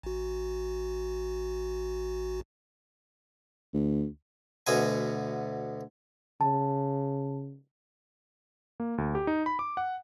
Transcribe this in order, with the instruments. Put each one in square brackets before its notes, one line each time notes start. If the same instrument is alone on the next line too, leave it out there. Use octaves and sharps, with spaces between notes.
[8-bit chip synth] A1 F#4
[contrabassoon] D2
[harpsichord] D2 B2 B3 G#5
[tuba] C#3 [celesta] A5
[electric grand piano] A#3
D2
G4
D#4
B5
D6
F#5